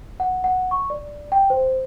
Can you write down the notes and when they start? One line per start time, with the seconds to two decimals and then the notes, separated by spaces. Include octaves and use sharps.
0.20 F#5
0.44 F#5
0.71 C#6
0.90 D5
1.32 G5
1.50 C5